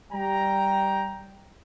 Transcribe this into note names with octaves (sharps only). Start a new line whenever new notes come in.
G3 G5 A#5